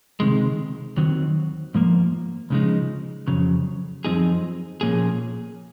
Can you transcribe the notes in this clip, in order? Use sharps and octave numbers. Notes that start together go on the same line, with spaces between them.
C#2 C3 D#3 G#3
D#2 D#3 F#3 C4
G#2 F3 A#3
C#2 C#3 F3 G#3 D#4
F2 C#3 F#3
F#2 F3 C4 D#4 G#4
A#2 F3 A#3 C#4 G#4